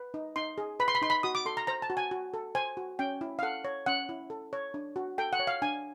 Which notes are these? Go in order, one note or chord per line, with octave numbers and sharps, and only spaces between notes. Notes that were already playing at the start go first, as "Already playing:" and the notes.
Already playing: B4
D#4
D#4 C6
G#4
B4 B5
C6
B5
D#4 C6
B5
F#4 D#6
D6
A4 C6
A#5
C5 A#5
A5
F#4
G#5
F#4
A4
C5 G#5
F#4
C#4 G5
E4
F5
A4 F#5
C#5
C#4 F#5
E4
A4
C#5
D4
F#4
A4 G5
F#5
C#5
F5
D4 G#5